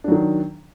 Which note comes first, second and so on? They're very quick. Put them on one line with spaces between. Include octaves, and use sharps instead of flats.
D4 F#3 D#3